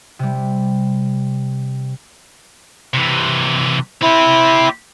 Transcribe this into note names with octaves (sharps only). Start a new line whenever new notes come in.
C3 G3
C3 E3
C4 E4 G4